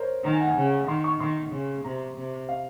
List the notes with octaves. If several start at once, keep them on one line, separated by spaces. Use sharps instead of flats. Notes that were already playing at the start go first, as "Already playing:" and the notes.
Already playing: A#4 C5 C#5
D#3 A#5
G#5
F#5
G#5
C#3
D#3 C6
C#6
D#3 C6
C#3
C3 A#5
C3
F5